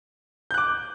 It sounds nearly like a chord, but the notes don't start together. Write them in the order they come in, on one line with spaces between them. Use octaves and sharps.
G6 F#6 D6